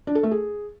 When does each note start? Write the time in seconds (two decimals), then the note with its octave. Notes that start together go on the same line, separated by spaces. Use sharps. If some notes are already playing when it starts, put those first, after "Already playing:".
0.07 D4
0.15 A4
0.23 A3
0.31 G#4